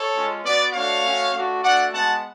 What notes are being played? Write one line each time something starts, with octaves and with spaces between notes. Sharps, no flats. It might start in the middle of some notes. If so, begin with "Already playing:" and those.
Already playing: A4 C#5
G#3 C#4 F4
B3 F#4 B4 D5
A3 D4 F#4 C#5 F5
A3 C#4 F#4
A3 D4 F#4
A3 D4 F#4 D5 F#5
G#3 B3 F#4 F#5 A5